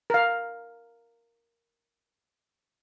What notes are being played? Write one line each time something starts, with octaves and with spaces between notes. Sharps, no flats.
A#4 F5